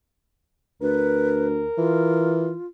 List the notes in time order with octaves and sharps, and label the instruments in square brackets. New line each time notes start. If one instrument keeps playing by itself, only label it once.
[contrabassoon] D2 [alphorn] A#4 [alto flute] B4
[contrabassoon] E3 [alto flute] F4